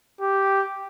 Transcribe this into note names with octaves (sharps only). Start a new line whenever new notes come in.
G4